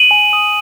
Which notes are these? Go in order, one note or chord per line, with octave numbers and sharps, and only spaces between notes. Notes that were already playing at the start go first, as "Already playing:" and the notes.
Already playing: D#7 F#7
G#5
D#6